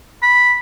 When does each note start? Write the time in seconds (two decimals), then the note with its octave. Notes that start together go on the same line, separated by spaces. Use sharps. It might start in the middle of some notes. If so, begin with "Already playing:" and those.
0.23 B5